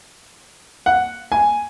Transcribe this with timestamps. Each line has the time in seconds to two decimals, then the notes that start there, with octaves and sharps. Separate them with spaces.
0.86 F#5
1.32 G#5